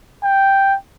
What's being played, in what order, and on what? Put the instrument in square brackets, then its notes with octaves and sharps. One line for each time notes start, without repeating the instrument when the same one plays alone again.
[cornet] G5